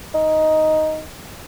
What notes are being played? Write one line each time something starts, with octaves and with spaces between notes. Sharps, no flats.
D#4